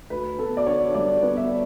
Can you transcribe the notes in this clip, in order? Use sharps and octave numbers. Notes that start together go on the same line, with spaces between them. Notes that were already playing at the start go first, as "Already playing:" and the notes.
D2 B4
B3 A4
D5
D3 C#5
G3 D5
B3
E5